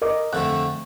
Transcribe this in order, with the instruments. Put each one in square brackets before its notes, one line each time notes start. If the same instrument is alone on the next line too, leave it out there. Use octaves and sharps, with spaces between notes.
[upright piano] A#4 D#5 D6
[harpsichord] F2 D3 A3 [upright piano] F#6